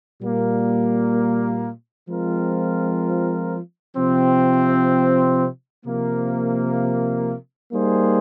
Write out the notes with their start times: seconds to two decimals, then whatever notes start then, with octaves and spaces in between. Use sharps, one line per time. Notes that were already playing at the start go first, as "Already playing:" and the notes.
0.20 A#2 G3 A#3
2.09 F3 G#3 C4 F4 A#4
3.97 C3 F3 C4
5.85 C3 F3 A#3
7.73 G3 A#3 D#4 G#4 C5